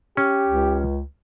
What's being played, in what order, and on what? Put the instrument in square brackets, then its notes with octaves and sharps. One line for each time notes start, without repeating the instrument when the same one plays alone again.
[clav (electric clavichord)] C#4 [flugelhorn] G4
[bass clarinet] C#2